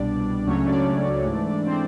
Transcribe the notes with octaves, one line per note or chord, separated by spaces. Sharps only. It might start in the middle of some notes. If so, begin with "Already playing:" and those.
Already playing: C2 B2 G3 D4 D5
C#2 C#3 F#3 A3 C#4 C#5
D4 D5
G#2 E3 A3
C4 C5